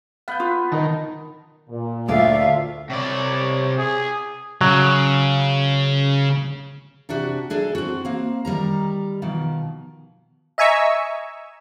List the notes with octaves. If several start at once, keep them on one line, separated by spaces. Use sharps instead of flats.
B3 F5 F#6 G6
F4 D#6
D#3 A#4 D#5 A5
A#2
D2 F4 D5 E5 F5
C3 C#5 D5
G#4
C#3 F#3
C3 D4 F#4 G4
D2 D4 G#4 A4
C4 F#4
A#3 C4
D#3 G3 A#4 A#5
B2 D#3 F3
D#5 E5 G#5 A#5 C#6 E6